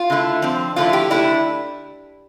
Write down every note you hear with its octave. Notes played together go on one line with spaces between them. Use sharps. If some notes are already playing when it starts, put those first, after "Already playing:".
Already playing: F4
D3 A3 E4
D3 F3 C4
D3 F3 A3 E4 F4
G4
D3 A3 D4 E4